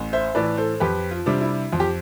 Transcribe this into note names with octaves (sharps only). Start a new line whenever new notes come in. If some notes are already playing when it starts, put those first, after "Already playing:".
Already playing: A1
C5 E5
A2 E3 B4 D5
A4 C5
F2 G4 B4
F4
C3 G3 D4
E4
F2 F4
G4